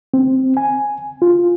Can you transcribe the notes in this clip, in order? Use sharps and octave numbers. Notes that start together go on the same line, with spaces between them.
C4
G#5
F4